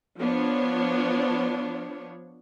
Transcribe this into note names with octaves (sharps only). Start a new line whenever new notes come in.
F3 B3 D4 C#5